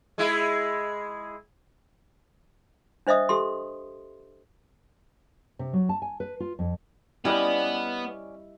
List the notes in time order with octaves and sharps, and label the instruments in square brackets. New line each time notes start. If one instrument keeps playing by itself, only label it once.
[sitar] G#3 E4 G#4
[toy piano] D4 C5 D#5 E5 D#6
G4 A4 C6
[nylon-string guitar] C3
F#3
A5
G#5
B4
F4
F2
[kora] G3 B4 [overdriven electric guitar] B3 [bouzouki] C#4 D5 G5 [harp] E4 D#5